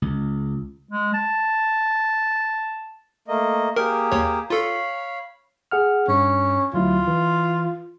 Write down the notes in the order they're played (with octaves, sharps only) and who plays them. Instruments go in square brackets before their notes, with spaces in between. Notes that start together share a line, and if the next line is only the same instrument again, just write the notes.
[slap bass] C#2
[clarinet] G#3
A5
[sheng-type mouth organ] A3 A#3 D#5
[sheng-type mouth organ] A#3 G4 G#4 [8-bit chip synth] A#4
[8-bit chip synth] D#2 C#5
[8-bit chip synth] F4 A4 [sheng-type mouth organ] C#5 F5 B5
[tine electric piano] G#4 F#5 F6
[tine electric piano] G2 [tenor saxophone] C#4
[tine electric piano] D2 F#3 E4 [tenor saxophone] F4
[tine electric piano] E3